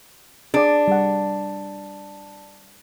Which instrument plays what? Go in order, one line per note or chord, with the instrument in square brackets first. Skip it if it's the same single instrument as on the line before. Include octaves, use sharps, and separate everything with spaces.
[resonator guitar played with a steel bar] D4 [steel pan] G#4 D5
[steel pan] G3 F#5